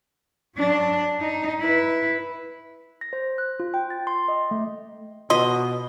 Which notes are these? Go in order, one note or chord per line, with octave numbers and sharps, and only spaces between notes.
F#3 D4
D#4
E4 B4
A#6
C5
F#6
F4
G5
A6
C6
D#5
A3
B2 F4 D#5 C6